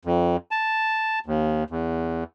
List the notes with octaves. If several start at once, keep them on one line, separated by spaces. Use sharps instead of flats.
F2
A5
D#2
E2